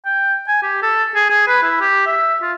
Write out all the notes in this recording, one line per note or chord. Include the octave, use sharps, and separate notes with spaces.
G5
G#5
G4
A4
G#4
G#4
B4
E4
G4
E5
F4